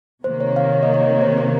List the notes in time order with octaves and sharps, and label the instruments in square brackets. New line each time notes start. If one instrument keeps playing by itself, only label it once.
[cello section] C3 D#3 A#3 [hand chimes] C5
[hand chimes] C#5
F5
C#5
D#5
C#5
C5
A#4